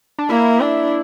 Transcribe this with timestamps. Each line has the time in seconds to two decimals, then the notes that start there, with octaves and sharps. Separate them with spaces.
0.19 D4
0.30 A#3 E4
0.60 D4